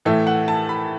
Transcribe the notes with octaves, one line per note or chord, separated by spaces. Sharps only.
A2 E3 A3 E5
F#5
A5
B5